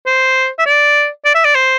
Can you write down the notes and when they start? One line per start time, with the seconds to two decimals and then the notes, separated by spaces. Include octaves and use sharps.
0.06 C5
0.59 E5
0.66 D5
1.25 D5
1.35 E5
1.45 D5
1.55 C5